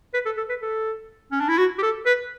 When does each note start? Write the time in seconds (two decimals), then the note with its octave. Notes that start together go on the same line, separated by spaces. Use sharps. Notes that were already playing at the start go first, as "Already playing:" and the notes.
0.14 B4
0.26 A4
0.37 A4
0.49 B4
0.62 A4
1.32 C#4
1.40 D4
1.49 E4
1.58 F#4
1.78 G4
1.83 A4
2.06 B4